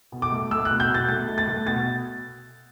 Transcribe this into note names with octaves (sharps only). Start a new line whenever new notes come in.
B2
D6
A3
A3 E6
B2 F#6
G6
B2 A6
A3 A6
A3
A6
A3
B2 A6